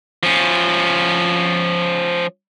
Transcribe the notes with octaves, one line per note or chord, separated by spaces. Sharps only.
F3 C#4